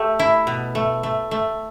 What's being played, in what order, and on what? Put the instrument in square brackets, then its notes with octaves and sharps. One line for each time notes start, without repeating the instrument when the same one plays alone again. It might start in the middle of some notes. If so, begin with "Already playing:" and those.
Already playing: [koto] A3 G4
E4
B2
A3
A3
A3